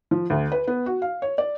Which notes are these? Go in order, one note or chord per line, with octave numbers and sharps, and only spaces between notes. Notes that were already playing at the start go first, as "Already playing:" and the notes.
F3
D2
B4
B3
F#4
F5
C#5
D5